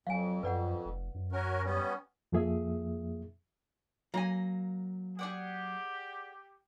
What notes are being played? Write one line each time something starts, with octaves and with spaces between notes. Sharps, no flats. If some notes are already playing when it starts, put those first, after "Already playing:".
F2 F#3 F5 G#5
F#2 B4 D5 F#5
F1
F#2
C#4 F#4 A#4
G3 B3 C#4
F2 F3 A#3 G#4 E5
F#3 A#3 G#5 A#5
G4 G#4 D5 F#5